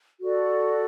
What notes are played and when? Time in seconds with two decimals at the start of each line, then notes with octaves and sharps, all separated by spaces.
0.20 F#4 A4 D5